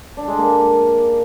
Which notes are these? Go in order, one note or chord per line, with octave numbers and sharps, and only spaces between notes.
D4
G#3
A#3